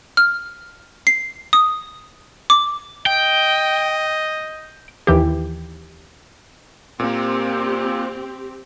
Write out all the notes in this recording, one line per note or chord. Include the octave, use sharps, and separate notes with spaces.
F6
C7
D#6
D6
D#5 G5
D#2 E3 G4
A#2 A#3 C4 G4